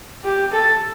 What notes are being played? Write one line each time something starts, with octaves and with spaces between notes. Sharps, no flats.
G4
A4